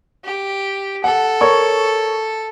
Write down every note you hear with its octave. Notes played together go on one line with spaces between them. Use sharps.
G4
A4 F#5
A#4 C#5 C#6